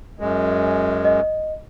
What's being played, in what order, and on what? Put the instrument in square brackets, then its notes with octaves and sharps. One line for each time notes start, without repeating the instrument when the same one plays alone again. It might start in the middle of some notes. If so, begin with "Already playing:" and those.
[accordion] F#2 G#3
[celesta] D#5